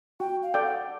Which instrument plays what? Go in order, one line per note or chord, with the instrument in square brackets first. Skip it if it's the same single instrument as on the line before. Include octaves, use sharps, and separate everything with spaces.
[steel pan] F#4 [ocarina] G5
[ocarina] F5
[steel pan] A4 D5 G5
[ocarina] F#5